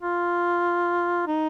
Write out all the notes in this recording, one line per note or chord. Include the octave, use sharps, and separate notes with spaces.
F4
D#4